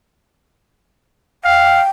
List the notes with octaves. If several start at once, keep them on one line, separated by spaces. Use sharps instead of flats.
F5 G5